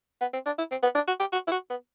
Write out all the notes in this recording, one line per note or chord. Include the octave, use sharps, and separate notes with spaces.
B3
C4
D4
E4
C4
B3
D4
F#4
G4
F#4
E4
F#4
B3